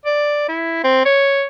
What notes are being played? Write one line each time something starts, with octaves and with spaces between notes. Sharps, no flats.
D5
E4
C4
C#5